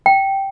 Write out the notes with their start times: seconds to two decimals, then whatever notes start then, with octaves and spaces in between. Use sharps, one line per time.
0.06 G5